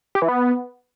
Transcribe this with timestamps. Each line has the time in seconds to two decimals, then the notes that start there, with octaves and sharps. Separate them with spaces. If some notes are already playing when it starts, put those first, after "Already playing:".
0.15 G4
0.22 E3
0.28 B3